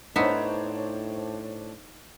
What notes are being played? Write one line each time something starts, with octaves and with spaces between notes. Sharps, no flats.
A2 B3 D4 D#4 C5 C#5 E5